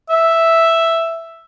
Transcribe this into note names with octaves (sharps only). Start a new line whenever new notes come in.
E5